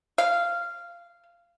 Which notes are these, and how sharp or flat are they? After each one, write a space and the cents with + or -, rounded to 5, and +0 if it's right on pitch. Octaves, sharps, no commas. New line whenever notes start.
F5 -15